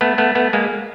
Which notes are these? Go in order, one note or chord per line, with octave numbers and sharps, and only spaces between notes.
A3 B3
A3 B3
A3 B3
G#3 A#3